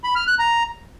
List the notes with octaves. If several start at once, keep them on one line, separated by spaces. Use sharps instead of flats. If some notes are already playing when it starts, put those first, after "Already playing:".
B5
F6
F#6
A#5